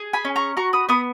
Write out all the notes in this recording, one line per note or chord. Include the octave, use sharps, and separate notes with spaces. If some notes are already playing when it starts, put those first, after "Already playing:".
Already playing: G#4
G#5 B5
C#4
A#5 C#6
F#4 A#5 C#6
B5 D#6
B3 B5 D#6